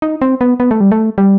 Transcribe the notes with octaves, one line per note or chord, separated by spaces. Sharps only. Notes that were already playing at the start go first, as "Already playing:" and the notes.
D#4
C4
B3
B3
A3
G3
A3
G3